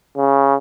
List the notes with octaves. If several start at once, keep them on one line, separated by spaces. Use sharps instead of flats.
C#3